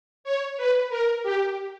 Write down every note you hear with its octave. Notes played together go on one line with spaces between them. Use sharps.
C#5
B4
A#4
G4